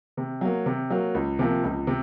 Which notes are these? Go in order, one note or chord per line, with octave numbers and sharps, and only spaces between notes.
C3
F#3 A#3
C3
F#3 A#3
C#2
C3 F3 A#3
C#2
C3